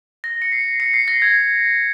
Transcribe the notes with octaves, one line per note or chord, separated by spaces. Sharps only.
A#6
C#7
C7
C#7
C7
A#6
G#6